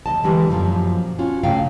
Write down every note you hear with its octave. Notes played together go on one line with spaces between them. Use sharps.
D#2 D#5 A5
D3 E3 G3 G#3
F#2 A#2 D#3 F3 F#3
C#4 F4 F#4
A#2 C#3 A3 A#3 F5 G5